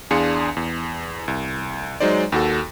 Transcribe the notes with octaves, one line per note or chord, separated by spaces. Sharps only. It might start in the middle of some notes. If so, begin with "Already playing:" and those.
E2 D4 G#4 F5 C6 C#7
E2
C2
F#3 G#3 D#4 C5 D5
D#2 F#4 A4